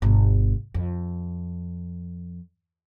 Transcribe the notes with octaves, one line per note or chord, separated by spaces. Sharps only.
G1 B2
F2